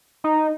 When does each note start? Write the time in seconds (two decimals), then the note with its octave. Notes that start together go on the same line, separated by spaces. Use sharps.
0.24 D#4